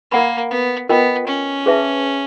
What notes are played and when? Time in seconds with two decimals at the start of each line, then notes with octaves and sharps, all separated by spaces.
0.11 A#3 A#4 D5 F#5 B5
0.51 B3
0.89 B3 F4 A#4 D#5 G5
1.27 C#4
1.66 G#4 B4 E5 A5